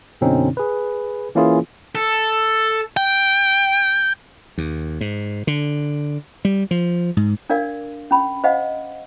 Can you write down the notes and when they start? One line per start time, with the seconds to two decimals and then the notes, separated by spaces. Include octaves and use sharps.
0.21 F#2 B2 D3 C4 C#4 D#4
0.57 G#4 B4
1.35 E3 A#3 C#4 E4 F4 G#4
1.95 A4
2.97 G5
4.58 D#2
5.01 G#2
5.47 D3
6.45 G3
6.71 F3
7.17 G#2
7.50 D4 A#4 D5 F5
8.11 C#4 B5
8.44 C5 D#5 F5 F#5